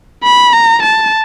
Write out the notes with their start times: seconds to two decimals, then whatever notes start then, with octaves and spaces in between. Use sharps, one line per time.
0.23 B5
0.53 A#5
0.83 A5